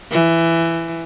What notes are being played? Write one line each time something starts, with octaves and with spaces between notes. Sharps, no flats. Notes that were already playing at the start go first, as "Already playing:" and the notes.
E3